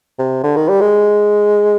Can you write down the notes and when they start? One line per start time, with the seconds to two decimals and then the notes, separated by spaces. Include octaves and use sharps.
0.19 C3
0.43 D3
0.56 D#3
0.68 G3
0.81 G#3